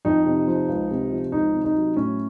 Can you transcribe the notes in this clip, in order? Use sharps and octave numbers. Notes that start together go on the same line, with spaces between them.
F2 D#4
C3
F3
C#2
C3
F3
C#2 D#4
C3
D#4
F#3
A2 C#4